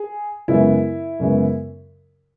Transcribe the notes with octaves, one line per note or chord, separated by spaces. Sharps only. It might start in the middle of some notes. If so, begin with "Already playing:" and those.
Already playing: G#4
F#2 C#3 G#3 B3 E4
F#2 C#3 G#3 B3